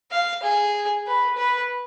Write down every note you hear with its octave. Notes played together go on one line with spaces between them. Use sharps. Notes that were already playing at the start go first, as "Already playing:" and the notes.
F5
G#4
B4
B4